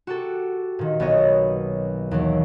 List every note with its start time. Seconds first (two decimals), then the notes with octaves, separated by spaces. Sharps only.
0.07 F#4 G4 A4
0.79 A#2 D#3
1.00 B1 B3 C#5 D#5
2.11 D#2 E3 F#3